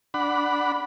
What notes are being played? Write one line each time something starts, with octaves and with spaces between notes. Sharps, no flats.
D4 F#5 B5